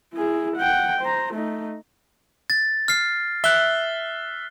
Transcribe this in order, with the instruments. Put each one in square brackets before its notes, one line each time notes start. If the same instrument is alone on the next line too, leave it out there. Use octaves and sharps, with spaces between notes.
[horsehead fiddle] E4 G#4
F#5 G5
C5 A#5
A3 D#4
[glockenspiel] A6
F6 C7
[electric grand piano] E5 F#6 [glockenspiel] G7